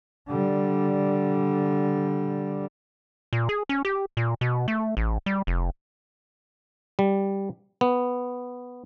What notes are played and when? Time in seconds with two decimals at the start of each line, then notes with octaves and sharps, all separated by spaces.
0.28 D3 G3
3.33 A#2
3.49 G#4
3.69 C#4
3.85 G4
4.17 A#2
4.41 B2
4.68 A3
4.97 A1
5.26 G3
5.47 F1
6.99 G3
7.81 B3